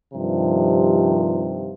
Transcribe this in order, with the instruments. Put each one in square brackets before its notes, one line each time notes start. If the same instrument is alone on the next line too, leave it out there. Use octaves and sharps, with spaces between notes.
[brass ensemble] G2 C3 D#3 F3